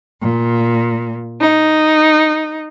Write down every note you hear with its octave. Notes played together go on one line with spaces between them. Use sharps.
A#2
D#4